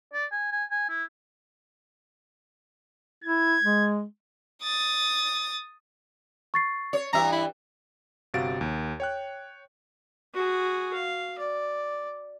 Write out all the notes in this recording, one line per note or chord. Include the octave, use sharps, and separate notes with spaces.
D5
G#5
G#5
G#5
E4
E4 G#6
G#3
D#6 A6
C#6 A6 C7
C#5
G2 E3 E5 A#5
E4
G1 C3 F#4 F5 A6 D7
D#2
C#5 G5 F#6
F#4 G#4
F5
D5